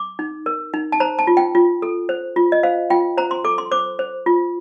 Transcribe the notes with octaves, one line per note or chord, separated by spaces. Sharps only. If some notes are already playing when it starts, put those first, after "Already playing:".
Already playing: D6
D#4
A#4
D#4
A5
C5 A#5
A5
F4
G5
F4
A4
C5
F4
D#5
C5 F5
F4 G5
C5 A#5
C6
A4 D6
C6
C5 D6
C5
F4